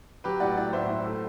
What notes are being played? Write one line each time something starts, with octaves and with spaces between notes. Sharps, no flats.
F#3 G4 B4
A2 D5 F#5
A2 D5 F#5
A2 C5 E5
A2
A3